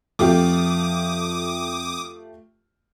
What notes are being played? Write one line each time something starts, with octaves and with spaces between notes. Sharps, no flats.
F2 A3 F4 G4 D6 D#6